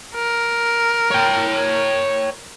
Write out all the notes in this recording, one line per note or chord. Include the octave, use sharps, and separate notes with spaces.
A#4
C#5 G5